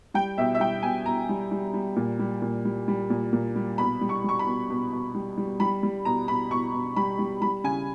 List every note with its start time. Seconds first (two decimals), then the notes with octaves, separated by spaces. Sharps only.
0.14 G3 G5
0.38 B2 E5
0.55 E5
0.60 G3 G5
0.83 B2 G#5
1.06 B2 A#5
1.29 G3
1.51 G3
1.74 G3
1.96 A#2
2.19 G3
2.42 A#2
2.65 G3
2.88 G3
3.10 A#2
3.33 A#2
3.56 G3
3.78 B2 B5
4.01 G3
4.09 C#6
4.24 G3 C#6
4.39 B5
4.46 B2
4.70 B2
4.92 B2
5.14 G3
5.37 G3
5.60 G3 B5
5.83 G3
6.05 B2 A#5
6.28 B2 B5
6.51 B2 C#6
6.74 B2
6.96 G3 B5
7.19 G3
7.41 G3 B5
7.64 C#3 G#5